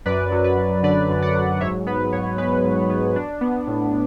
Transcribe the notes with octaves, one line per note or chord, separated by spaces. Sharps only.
F#2 B4 D5
F#3
B4
F#2
D3 B4 D5
F#2
D5 F#5
F#3
G#2 C#5 E5
B3 B4
G#2 C#5
G#3 B4
G#2
B3
D4
B3
A2